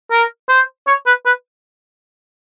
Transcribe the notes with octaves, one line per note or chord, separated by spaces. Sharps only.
A#4
C5
C#5
B4
B4